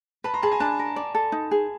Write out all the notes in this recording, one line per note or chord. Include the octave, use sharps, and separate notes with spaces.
B4 A5 B5
A#5 C6
G#4 A5 B5
G#5 A#5
D4 A5 B5
A#4
D5
A4
D#4
G#4